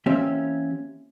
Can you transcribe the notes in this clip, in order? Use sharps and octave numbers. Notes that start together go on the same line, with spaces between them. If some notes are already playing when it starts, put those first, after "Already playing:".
E3 A#3 C4 C#4 G4 E5